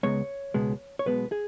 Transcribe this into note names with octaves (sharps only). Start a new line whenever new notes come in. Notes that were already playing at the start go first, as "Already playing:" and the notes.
C#2 B2 G#3 B3 C#5
C#2 B2 G#3 B3
C#5
B1 B2 G#3 B3 B4
G#4